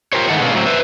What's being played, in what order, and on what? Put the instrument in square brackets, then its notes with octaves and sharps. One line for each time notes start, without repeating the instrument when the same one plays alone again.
[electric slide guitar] F4 G4 A#4 C5 C#5
D#3 G#3 A3 F#5
B2 D3 G#3 A#3 C#4 F4
A2 F#3 C4
B4 C5 E5